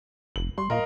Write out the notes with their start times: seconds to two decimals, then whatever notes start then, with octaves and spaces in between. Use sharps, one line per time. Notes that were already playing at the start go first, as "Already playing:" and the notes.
0.36 F1 F#7
0.58 G3 C6
0.70 A#2 A#4 D#5 F5